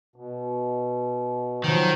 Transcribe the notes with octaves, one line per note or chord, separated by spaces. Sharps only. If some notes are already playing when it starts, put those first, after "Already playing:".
B2
D#3 F3 F#3